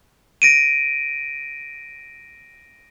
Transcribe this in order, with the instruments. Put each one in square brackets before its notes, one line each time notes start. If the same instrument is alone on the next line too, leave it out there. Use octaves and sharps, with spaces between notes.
[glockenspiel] A#6 D7 D#7